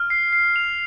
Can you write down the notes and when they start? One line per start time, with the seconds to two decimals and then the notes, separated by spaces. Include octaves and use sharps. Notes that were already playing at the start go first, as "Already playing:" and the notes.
Already playing: F6
0.10 C7
0.33 C7
0.56 F7